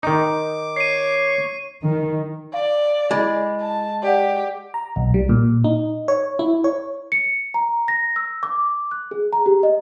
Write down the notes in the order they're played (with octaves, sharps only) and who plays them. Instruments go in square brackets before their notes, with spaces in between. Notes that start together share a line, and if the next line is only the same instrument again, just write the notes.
[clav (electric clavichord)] D#3 D#4 [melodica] D6
[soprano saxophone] C#5 [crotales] C7 D#7
[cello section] D#3
[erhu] D5 [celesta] F5
[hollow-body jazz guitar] G#3 [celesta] E4 B5 A6
[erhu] A5
[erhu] G4 [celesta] D5 F#5
[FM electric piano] A#5
B1
G3
A#2
D#4
C#5
E4
C#5
[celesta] C#7
A#5
A#6
E6
D6
F#6
G#4
A#5
G4
D#5